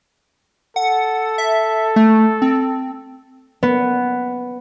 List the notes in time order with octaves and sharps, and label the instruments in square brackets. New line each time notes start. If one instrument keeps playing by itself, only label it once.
[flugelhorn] A4 [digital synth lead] F#5
[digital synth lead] E5
A3
C4
[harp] B3